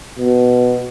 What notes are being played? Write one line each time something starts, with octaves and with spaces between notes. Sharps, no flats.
B2